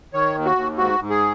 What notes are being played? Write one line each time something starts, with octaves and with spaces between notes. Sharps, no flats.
D#3 C#5
D#2
F#4
D#2
G#2 F#4
G#2
G#4